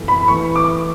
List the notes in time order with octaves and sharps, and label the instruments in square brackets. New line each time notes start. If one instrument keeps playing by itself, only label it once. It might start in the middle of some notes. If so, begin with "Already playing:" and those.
Already playing: [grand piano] F#2 E3 B3 E4 A4
[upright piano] B5
[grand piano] E3 A3 E4 [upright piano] C#6
[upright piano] D6